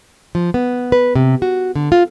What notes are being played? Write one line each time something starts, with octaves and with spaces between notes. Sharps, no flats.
F3
B3
B4
C3
F#4
D3
F4